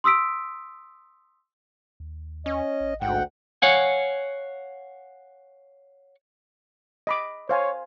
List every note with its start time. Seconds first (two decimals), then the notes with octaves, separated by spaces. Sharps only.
0.04 C6 D#6 E6 B6 D7
2.00 D#2
2.46 C#4 D#5
2.80 A1
3.01 D2 G#2 F#5 G5
3.62 C#5 F5 F#5 G#5
7.07 D#5 B5 D6
7.49 C5 C#5 F5 G#5